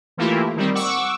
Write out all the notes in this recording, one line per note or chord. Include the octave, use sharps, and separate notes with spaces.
E3 A3 A#3 E4 F4 G4
D#3 G3 C4
F#5 C#6 D6 E6